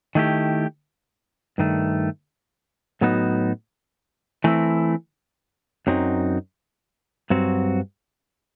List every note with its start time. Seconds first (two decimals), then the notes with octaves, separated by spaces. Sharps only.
0.15 D#3 A3 E4 G4
1.58 G2 D#3 A3
3.01 A2 F#3 B3 D#4 F#4
4.44 E3 A3 C4 E4
5.87 F#2 F#3 C4 D#4
7.30 G2 F#3 C4 F#4